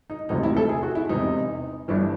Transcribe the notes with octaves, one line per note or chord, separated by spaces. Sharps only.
D#4
E1 D2 C3 F3 D#4
E4
A4
G#4
F#4
E4
E1 E2 C3 D#4
G1 G2 E3 D4